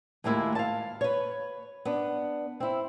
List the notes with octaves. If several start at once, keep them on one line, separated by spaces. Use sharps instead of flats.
D#2 A2 G#3 A#3 E4 F4
F5 A5
B4 C#5
B3 D4
C4 E4